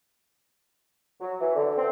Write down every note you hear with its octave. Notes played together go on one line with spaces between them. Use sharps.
F#3
E3
D3
C4